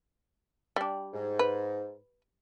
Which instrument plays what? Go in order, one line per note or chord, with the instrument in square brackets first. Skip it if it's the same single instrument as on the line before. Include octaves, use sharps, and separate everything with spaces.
[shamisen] G3 D4
[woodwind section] G#2
[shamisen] B4